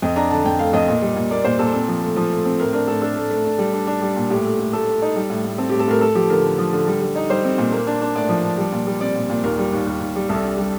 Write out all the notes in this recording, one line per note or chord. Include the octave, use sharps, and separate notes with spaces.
F2 D#5
D4 A#5
D3 A5
F2 G5
A3 F5
F2 D#5
A#2
G3
A#2
A#3 D5
A#2 C5
A#2 A4
C4
F3
A3
F3
A3
C4
A2 A#4
D4 A#4
A2 A4
D4 A4
A3
A3
D4
G3
D4
D4
G3
A#2
A2 G4
A3
A2
A3 A4
A3
D#4
G3
A2
A2
C4 A4
G4
A2
A4
A2 A#4
A3 A4
F3 G4
D3 A#4
D3
F3
D3
G3
G3
D#4
G3 C5
C4
A#2
A#3
D4
D4
A2 D5
F3
D4
G3
A#2
G3
C4 D5
A#2
A#2
D#2 A#4
G3
D#2
D#2
D#2
G3
C2 A4
D4
G3